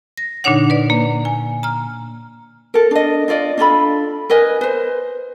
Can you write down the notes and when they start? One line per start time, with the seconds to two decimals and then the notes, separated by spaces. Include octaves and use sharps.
0.17 A#6
0.44 A#2 D3 D4 D#4 C#5 F#5
0.70 B4 D5
0.90 A#3
1.25 G#5
1.63 A#5 F6
2.74 A4 A#4
2.91 D4 D#5
3.28 D4 F4 D5 D#5
3.58 D4 F4 A4 B5
4.30 A#4 B4 D#5 G#5
4.61 B4 C5